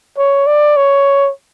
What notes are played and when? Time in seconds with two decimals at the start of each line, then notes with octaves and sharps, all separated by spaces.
0.18 C#5
0.47 D5
0.76 C#5